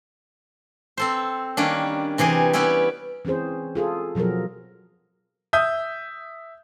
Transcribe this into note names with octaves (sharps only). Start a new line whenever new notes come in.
C4 A4 C5
D#3 G3 A#3 C#4 D4
C3 E3 G4 G#4
G3 B3 C#4 E4 G4
E3 C4 C#4 G#4 C5
F4 G#4 A4
B2 F3 F#3 G#4 A#4
E5 D#6 G6